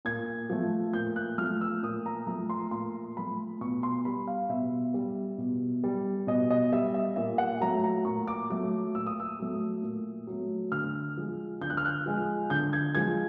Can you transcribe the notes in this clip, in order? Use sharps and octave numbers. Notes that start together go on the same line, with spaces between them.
A#2 G#6
F3 A3
A#2 G6
F#6
F3 A3 F6
E6
A#2 D#6
A#5
F3 A3 A#5
C6
A#2 C6
F3 A3 B5
B2 C#6
C6
G3 B5
F5
B2 E5
G3
B2
G3
B2 D#5
D#5
G3 E5
E5
A#2 E5
F#5
F#3 A3 A#5
A#5
A#2 C#6
D6
F#3 A3 D6
A#2 E6
D#6
E6
F#3 A3
A#2
F#3
A3
D3 F6
F3 G#3
D3 G6
F#6
F6
F#6
F3 G#3
D3 G6
G#6
F3 G#3 G#6